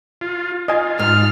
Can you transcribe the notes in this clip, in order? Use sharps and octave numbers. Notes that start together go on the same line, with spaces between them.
F4
F4 D#5 G#5
G#2 F6